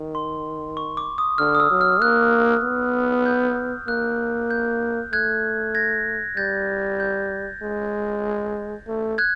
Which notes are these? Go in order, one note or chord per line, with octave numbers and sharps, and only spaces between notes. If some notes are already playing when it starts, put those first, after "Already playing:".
Already playing: D#3
C6
C#6
D6
D#6
D3 F6
D#6
E6
F#3
F6
A#3 F#6
B3
G6
A#3 F#6
G6
A3 F#6 G#6
G#6 A#6
G3 G6 A6
G6
G#3
A3
F#6 G#6